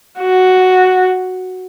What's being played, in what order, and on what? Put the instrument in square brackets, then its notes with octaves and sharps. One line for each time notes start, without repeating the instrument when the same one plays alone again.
[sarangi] F#4